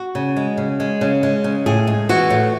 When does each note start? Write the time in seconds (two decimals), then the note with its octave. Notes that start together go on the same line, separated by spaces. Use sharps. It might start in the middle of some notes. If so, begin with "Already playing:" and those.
Already playing: F#4
0.15 C#3
0.36 G#3
0.58 C#3
0.80 G#3
1.01 C#3
1.23 G#3
1.44 C#3
1.66 A2 G#4
1.87 G#3
2.09 E3 F#4
2.30 A2